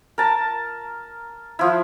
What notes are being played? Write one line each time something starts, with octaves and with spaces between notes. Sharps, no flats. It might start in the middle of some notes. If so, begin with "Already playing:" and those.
A#4 A5
F3 E4